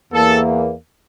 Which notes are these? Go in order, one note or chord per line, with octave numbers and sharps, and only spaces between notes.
E2 E3 A#3 A4